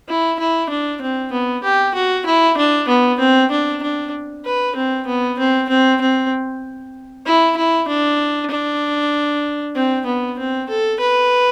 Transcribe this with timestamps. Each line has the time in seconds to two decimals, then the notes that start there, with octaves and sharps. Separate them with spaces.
0.08 E4
0.39 E4
0.69 D4
1.01 C4
1.32 B3
1.64 G4
1.94 F#4
2.26 E4
2.57 D4
2.88 B3
3.20 C4
3.51 D4
3.83 D4
4.45 B4
4.76 C4
5.07 B3
5.38 C4
5.69 C4
6.01 C4
7.26 E4
7.57 E4
7.88 D4
8.50 D4
9.75 C4
10.06 B3
10.38 C4
10.69 A4
11.00 B4